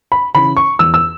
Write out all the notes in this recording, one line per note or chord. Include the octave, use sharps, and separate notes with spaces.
B5
C#3 E3 B5
C#6
E2 E6
E6